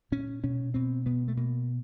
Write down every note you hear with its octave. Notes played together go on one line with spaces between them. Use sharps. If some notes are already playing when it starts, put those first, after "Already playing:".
A#2 C#4
B2 C#4
B2 C4
B2 B3
A3
B2 A#3